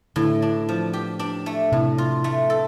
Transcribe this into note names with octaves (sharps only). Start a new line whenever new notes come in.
A2 D3
D4
F3
G4
D4
A3
A2 C3
F4
A3
A4